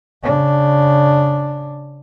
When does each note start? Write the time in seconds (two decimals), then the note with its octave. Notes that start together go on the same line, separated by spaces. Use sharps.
0.23 C#3 D4